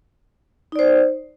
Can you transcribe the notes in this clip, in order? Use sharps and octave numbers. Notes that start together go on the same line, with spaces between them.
D#4 C5 D5